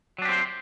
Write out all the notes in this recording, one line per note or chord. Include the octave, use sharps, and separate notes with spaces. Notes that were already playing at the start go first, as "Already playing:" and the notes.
F#3 C4 D4 G4 C5